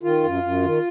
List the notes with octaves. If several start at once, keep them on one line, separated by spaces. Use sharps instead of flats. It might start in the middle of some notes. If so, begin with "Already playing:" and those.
D#3 F4
F#2
F#2
D#3